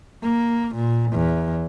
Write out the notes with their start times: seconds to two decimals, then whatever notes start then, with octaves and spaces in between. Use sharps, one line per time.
0.23 A#3
0.75 A#2
1.12 E2